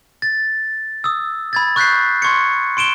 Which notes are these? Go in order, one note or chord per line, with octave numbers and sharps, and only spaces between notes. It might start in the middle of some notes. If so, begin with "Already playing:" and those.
A6
D#6 E6
B5 G#6 A6
C#6 F#6 G6 B6 C7
C6 C#6 G#6 C#7
C6 D7 E7 G7